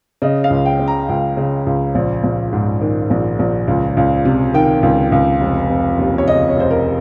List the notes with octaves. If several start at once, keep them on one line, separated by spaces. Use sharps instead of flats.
C#3 D#5
F5
C#2
G5
C#3
A#5
C#2 G5
C#3
C#2
A#1
A#1
G#2
D#3
A#1
A#1
C#2
C#2
C3
D#3 G5
C#2
C#2
F1
F1
D#2
C#5
C#3 D#5
C#5
F1 C5
A#4